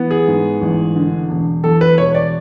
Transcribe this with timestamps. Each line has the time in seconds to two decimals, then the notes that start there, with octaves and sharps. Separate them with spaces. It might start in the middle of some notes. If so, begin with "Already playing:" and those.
Already playing: E3 B3
0.11 G#4
0.28 G#2
0.61 A1
0.96 D3
1.29 E1
1.63 E2 A4
1.81 B4
1.98 E1 C#5
2.15 D5